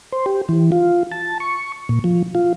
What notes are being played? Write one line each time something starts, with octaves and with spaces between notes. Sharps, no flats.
C5
G4
E3
F4
A5
C#6
A#2
F3
F4